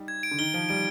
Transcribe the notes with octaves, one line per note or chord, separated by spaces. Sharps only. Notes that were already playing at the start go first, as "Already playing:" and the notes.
Already playing: G3 D#4
G#6
D7
D3
D#3 G7
F3 D7
G3 D7